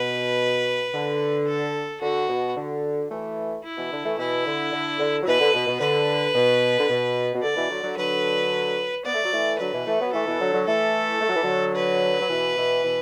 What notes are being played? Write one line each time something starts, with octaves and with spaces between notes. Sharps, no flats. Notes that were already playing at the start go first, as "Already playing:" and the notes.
Already playing: B2 B4
D3
A4
D3 F#4
B2
D3
E3 A3
E4
B2 E3
D3
E3 A3
B2 E3 E4
D3
D3
D3
F#3
B2 E3 B4
D3
B2
B2
D3 B4
B2
D3
B2
B2
D3 D5
B2 E3
D3 F#3
D3 F#3
D3 F#3 B4
B3 D5
A3
F#3
E3 A3
D3 F#3 B4
B2 E3
E3 A3
F#3 B3
E3 A3 A4
B2 E3
D3 F#3
D3 F#3
E3 A3 A4
A3
F#3
E3
D3 F#3
B4
F#3
B2 E3
B2 E3
B2 E3